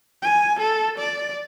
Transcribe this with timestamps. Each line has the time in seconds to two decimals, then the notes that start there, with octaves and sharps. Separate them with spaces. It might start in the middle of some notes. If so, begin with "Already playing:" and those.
0.22 G#5
0.60 A4
0.98 D5